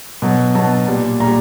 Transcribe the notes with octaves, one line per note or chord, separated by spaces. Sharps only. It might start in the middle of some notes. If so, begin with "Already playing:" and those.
B2 F#3
B2 F#3 A5
A#2 G3
A#2 G3 A#5